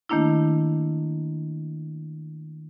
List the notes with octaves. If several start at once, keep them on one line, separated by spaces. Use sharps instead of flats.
D#3 A3 A#3 D4 E4